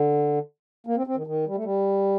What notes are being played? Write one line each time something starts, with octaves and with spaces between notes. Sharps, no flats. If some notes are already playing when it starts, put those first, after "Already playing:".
Already playing: D3
A#3
C4
C4
D#3
D#3
G3
A3
G3